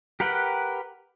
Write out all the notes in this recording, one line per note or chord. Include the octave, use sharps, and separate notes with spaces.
G4 A#4 B4 F#5 G5